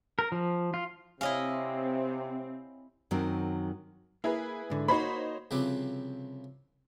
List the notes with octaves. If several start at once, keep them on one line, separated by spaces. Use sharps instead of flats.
A#4
F3
F4
C3 C4 E4 C#5 D#5 F5 G#5
F#2 D#3 F#3 C4
A#3 E4 G#4 B4
G#2 D3
A#3 D#4 F#4 C5 C#5 B5
C2 C#3 F3 C4 B4 D6